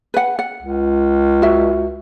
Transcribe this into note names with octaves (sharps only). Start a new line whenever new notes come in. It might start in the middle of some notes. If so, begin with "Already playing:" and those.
B4 F#5
F#5
C#2
F#4 E5